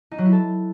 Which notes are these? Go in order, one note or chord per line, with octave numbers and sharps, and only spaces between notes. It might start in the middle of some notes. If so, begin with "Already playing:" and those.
D#4
F#3
E4
A4